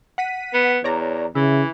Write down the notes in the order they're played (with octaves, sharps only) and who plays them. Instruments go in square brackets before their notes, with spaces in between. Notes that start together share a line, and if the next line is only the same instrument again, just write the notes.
[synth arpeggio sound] F#5 B6 D#7
[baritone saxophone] B3
[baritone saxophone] E2 [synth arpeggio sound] C#5 D5 A#5
[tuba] C#3 [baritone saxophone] E3 [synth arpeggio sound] E5